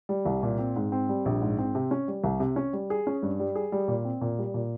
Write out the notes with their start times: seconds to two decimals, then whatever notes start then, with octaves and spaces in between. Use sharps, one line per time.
0.09 G3
0.25 C2
0.43 A#2
0.58 C4
0.76 G#2
0.92 C4
1.09 G3
1.25 A#1
1.42 G#2
1.58 C4
1.75 C3
1.91 C#4
2.08 G3
2.24 C2
2.40 C3
2.56 C#4
2.73 G3
2.90 G#4
3.07 C#4
3.23 G2
3.39 G3
3.55 G#4
3.72 G3
3.88 A#2
4.05 C4
4.21 A#2
4.39 G3
4.54 A#2